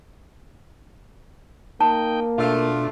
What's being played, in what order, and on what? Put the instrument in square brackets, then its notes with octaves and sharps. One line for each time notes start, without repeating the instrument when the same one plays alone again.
[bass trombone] A#3 [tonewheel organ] D#4 G5 [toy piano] A5
[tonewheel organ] B2 D4 [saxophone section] A3 F4